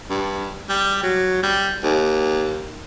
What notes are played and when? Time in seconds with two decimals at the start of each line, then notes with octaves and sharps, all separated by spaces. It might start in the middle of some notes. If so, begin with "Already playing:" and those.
0.10 G2
0.69 G3
1.03 F#3
1.43 G3
1.83 D#2